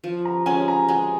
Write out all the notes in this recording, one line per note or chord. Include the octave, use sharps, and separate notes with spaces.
F3
A#5
G#3 C#4 G#5
A#5
G#3 G#5